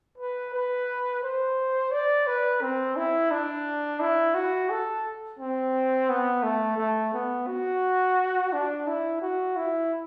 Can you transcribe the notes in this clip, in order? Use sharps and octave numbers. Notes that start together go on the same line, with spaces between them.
B4
B4
C5
D5
B4
C4
E4
D4
E4
F#4
A4
C4
B3
A3
A3
B3
F#4
D4
E4
F#4
E4